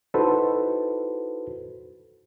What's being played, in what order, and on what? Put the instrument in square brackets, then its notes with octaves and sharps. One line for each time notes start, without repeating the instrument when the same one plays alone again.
[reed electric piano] D#4 E4 F#4 A4 B4 C5